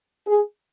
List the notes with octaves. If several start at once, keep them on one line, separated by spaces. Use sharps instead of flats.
G#4